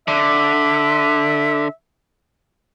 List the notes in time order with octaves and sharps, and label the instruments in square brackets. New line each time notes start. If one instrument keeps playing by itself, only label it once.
[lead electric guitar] D3 [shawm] E5